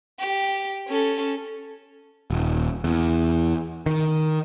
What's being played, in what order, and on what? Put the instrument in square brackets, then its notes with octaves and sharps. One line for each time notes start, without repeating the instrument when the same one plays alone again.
[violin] G4
C#4 A4
[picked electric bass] D#1
E2
D#3